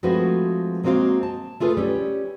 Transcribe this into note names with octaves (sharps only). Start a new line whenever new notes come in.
F3 G#3 A3 C4 F#4 B4
F#3 G#3 A#3 C4 F#4 F5
A5
A3 F4 G#4 A4 B4
G3 C#4